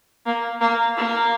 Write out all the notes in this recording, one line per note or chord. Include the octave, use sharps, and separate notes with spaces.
A#3
A#3
A#3